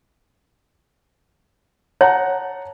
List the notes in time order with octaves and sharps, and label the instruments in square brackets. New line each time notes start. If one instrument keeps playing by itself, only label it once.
[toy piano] C#5 [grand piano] F#5 A5 A#5